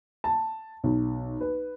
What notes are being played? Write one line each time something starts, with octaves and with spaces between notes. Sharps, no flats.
A5
B1
B4